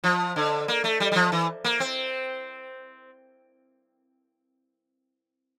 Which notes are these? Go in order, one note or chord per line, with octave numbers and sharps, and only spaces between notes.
F3
D3
A#3
A3
G3
G3
F3
E3
A#3
C4